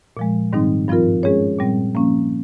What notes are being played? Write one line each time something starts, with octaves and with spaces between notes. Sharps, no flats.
A#2 F3 G#3
G#2 D#3 G3 C4 D#4
G2 F3 C4 F4 A#4
G#3 C#4 G#4 C#5
A#2 G3 C4
F3 A#3 C#4